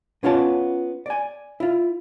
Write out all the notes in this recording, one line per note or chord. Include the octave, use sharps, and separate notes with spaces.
B3 C#4 F4 C#5 A5
D5 G#5
E4 F4